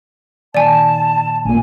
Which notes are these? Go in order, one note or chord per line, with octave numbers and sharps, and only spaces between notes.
A#2 D#3 D5 G#5 A5
A1 A#2 G#5